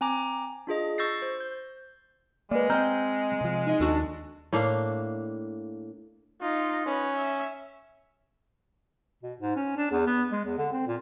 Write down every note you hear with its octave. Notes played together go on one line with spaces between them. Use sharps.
C4 G#5 A#5 D6
D4 F4 G#4 D#5
C#6 E6 G6 A6 A#6 C7
C5
G6
G#3 A#3 B4 D5
C4 C5 D#5 G5 A#5 F6 G6
C3 F3
D#4 G#4 D#5
D#2 D4 F#4 A4
A2 A#3 D4 F5
D#4 F4
C#4 B4
E5
B2
G#2
C#4
D4
E2
B3
G#3
E2
D3
C4
A#2